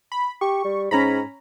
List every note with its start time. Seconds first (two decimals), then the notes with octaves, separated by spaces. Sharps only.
0.12 B5
0.41 G4 C#6
0.65 G3
0.91 G#2 C#4 A#5 B5